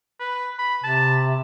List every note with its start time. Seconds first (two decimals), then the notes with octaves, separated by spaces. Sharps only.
0.20 B4
0.59 B5
0.84 C3 A5